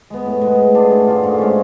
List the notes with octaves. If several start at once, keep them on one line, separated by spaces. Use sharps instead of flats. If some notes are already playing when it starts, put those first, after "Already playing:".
G#3 B3
A2
G#3 B3
A2
G#3 D4 F4
A2
G#3 D4 F4
G#2
G#3 C#4